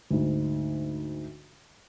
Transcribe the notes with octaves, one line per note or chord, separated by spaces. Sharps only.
D2 G#2